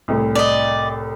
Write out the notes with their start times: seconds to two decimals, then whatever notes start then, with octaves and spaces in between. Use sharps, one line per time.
0.08 C2 A2 A3
0.35 D5 D#5